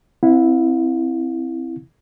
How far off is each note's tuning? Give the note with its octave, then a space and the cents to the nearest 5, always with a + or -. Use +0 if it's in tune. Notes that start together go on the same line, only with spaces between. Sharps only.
C4 +0 E4 +0 F5 +45